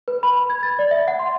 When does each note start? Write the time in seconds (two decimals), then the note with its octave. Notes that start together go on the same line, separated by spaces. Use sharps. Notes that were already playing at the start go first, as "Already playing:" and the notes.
0.08 B4
0.23 B5
0.36 B5
0.50 G#6
0.63 A6
0.79 D5
0.91 E5
1.08 F#5
1.19 C6